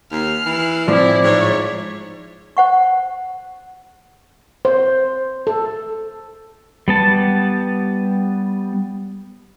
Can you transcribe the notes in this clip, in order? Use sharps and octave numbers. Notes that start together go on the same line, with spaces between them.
D#2 F6 C7
E3
A2 F3 C4 E4 D5
G#2 C#5 E5
C5 F#5 C#6
C5
A4
G3 B3 A5